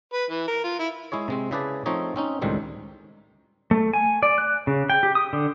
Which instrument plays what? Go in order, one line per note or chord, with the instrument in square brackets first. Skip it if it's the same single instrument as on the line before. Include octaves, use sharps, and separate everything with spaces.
[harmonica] B4
E3
A#4
F4
E4
[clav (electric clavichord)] G#3 E4 G#4 C#5
C3 G#3 C4
C#3 E4 G#4 B4 D5 A5
F3 A3 C4 D#4 C#5 D#5
C4 C#4 D#4
C#2 A2 D#3 G3 G#3 C4
[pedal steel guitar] A3
G#5
D5
F#6
C#3
G5
G4
D#6
D3